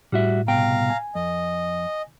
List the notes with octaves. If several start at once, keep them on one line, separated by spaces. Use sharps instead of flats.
A2 G3 F#4 E5
C2 B2 F5 G5 A#5
G#5
F2 D#5